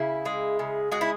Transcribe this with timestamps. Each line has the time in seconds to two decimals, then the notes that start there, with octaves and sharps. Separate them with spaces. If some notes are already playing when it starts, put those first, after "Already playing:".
Already playing: C#3 E4
0.25 G#3
0.59 C#3
0.92 G#3 F#4
1.01 E4